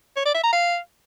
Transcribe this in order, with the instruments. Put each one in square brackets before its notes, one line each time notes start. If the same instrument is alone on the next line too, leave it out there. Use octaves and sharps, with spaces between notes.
[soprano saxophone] C#5
D5
E5
A#5
F5